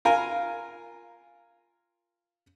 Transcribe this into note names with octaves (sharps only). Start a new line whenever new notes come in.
F4 A#4 G#5